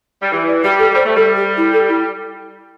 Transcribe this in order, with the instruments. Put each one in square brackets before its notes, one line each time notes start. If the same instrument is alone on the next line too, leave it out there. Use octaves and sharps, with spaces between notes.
[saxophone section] G3
[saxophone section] E3 [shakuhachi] G4
[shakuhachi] D5
[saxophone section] G3 [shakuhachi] G4
[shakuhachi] A4
[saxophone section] G3 [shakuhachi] C5
[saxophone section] A3
[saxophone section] G3 [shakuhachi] A4
[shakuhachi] G4
E4
A4
E4